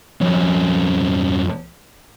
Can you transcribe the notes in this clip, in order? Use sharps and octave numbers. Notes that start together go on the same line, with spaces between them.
F2 C#4